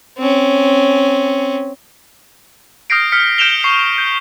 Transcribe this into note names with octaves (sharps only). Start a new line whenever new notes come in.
C4 C#4
D#6 F6 G6 A#6 C7 D7
F6 B6 C#7
F6 G6 D7 E7 F7 G7
C#6 C7
G6